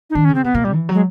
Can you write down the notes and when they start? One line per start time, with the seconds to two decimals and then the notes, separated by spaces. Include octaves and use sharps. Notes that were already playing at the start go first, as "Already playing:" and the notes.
0.10 D#4
0.15 D#3 D4
0.25 C#4
0.29 C#3
0.35 C4
0.44 C3 B3
0.54 B2 A#3
0.64 A#2 G3
0.74 E3
0.89 F#3
0.94 G#3